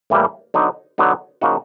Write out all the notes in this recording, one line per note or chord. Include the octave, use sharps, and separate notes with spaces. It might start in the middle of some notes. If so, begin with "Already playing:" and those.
A2 E3 G3 A#3
D3 F#3 B3 D#4
D3 F#3 B3 D#4
C#3 F3 A#3 D#4 F#4